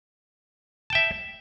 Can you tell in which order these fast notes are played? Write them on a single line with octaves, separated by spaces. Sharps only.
A5 G5 E5